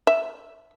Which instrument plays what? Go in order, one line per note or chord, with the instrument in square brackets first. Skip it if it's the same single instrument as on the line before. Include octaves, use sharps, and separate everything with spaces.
[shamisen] E5